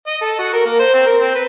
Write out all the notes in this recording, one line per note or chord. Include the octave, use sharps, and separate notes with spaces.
D#5
A4
F#4
A#4
A#3
C5
C4
A#4
C4
B4